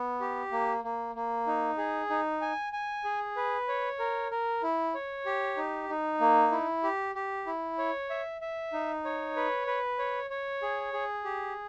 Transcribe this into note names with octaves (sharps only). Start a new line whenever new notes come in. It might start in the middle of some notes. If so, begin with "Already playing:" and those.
Already playing: B3
G4
A#3
A#3
A#3
D#4
G#4
D#4
G#5
G#5
G#4
B4
C#5
A#4
A#4
E4
C#5
G4
D#4
D#4
A#3
E4
G4
G4
E4
C#5
E5
E5
D#4
C#5
B4
B4
C#5
C#5
G#4
G#4
G4